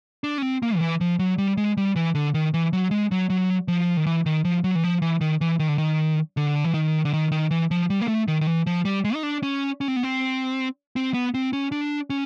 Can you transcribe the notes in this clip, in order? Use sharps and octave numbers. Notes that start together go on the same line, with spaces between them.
D4
C#4
C4
A#3
D#3
E3
F3
F#3
G3
G#3
G3
E3
D3
D#3
E3
F#3
G#3
F#3
F#3
F3
D#3
E3
D#3
F3
F#3
E3
F3
E3
D#3
E3
D#3
D3
D#3
D3
E3
D#3
D3
D#3
D#3
E3
F3
G3
A#3
A3
D#3
D#3
E3
F3
G3
G#3
D#4
D4
C#4
C#4
C4
B3
C4
C4
B3
C4
C#4
D4
C#4